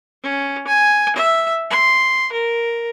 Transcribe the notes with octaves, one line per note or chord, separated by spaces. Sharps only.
C#4
G#5
E5
C6
A#4